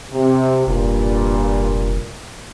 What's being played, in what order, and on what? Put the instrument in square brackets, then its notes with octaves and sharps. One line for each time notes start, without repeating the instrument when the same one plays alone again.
[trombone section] C3
[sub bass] F1 [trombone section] G2 A#2